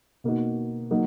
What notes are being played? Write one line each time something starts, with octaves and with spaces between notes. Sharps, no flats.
B2 A#3 D#4 F#4
F#3 A#3 D#4